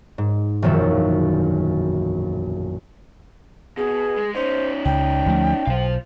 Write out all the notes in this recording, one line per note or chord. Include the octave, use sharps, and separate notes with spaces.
G#2
E1 A#1 F#2 D#3 E5
B2 G#4
G#3
C#4 D#4 C5
C#2 G5
D2 F3 A3
B1 C5 F5